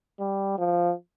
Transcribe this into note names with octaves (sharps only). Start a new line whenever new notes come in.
G3
F3